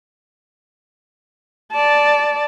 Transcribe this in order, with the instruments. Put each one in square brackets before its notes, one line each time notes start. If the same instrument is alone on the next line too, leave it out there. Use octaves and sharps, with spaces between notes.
[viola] D5 A5